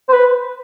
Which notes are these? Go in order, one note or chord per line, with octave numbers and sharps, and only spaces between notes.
C5
B4